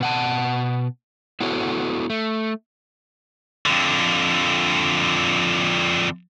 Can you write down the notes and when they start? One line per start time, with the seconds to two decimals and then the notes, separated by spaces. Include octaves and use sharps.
0.01 B2 F#5 A5
1.40 B3 E4 F#4 A4 C#5
2.10 A3
3.66 F2 D3